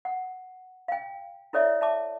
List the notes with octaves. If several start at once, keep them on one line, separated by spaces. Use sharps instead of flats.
F#5
F5 G5
E4 A4 C#5 D5 E5
E5 A5 D6